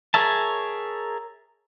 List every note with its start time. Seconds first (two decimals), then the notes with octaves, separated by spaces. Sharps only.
0.14 G#4 A#4 C#5 E5 A5